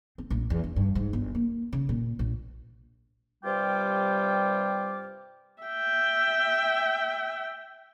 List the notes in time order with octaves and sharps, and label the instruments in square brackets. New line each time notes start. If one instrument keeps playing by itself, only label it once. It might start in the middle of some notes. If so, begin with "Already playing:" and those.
[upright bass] C4
A#1
E2
D4
G2
G#2
G1
A#3
C#3
A#2
A#1
[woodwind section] G2 C3 G3 F4 G5 D6
[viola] E5 G5